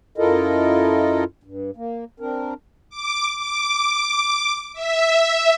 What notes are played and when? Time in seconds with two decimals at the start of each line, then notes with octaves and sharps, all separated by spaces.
0.18 F#2 E4 F4 A4 A#4 D#5
1.44 G2
1.77 A#3
2.20 C4 D4 A#4
2.90 D6
3.37 D6
4.73 E5